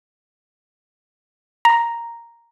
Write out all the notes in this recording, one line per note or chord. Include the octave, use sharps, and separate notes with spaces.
A#5